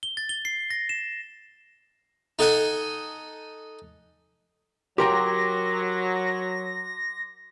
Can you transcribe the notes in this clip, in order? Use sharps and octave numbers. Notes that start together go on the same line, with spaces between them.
G7
A6
G7
C7
A#6
E7
D#4 A4 D#5 F#5 G#5
F#3 G4 A#4 G5 C6 D6 A#6